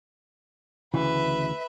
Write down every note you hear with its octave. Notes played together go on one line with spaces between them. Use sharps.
D2 C#3 E3 B4 E5